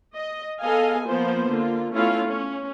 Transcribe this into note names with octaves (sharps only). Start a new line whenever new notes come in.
D#5
B3 G#4 A4 D#5 F5 G#5
F3 A#3 B3 F4 C5
D3 A#3 F4
A3 B3 C#4 E4 F4 F5
C#4